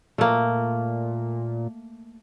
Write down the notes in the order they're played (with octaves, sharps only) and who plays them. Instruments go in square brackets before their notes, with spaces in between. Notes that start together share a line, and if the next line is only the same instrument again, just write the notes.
[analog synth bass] A#2 [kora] A3 A#3